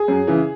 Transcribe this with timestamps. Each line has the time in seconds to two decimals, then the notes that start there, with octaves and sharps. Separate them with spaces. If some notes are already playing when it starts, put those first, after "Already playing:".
Already playing: G#4
0.08 F#2
0.27 C#3 E3